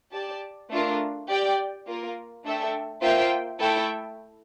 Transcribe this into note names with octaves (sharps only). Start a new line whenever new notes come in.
G4 D5 A5
A3 D4 F4 A#4
G4 D5 G5
A#3 F4 A#4
A3 D4 A4 E5 G5
A#3 F4 C5 E5 G5
A3 E4 A4 E5 G5